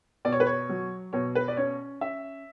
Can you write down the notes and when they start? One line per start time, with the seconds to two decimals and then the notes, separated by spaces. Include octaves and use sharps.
0.25 B2 D5
0.32 C#5
0.40 B4
0.47 C#5
0.69 F#3
1.13 B2 C#5
1.35 B4
1.48 D5
1.57 C#4 C#5
2.01 C#4 E5